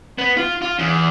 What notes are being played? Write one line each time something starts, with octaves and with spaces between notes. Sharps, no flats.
B3
F4
F4
E2